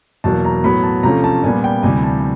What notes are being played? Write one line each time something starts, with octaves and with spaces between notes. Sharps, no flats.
E2 B2 F#3 A#3 A5
A#5
A2 F#3 B3 B5
A5
C3 F3 A3 C#4 A#5
A5
A#2 G3 B3 G#5
G5
D2 C3 E3 G3 G#5
A5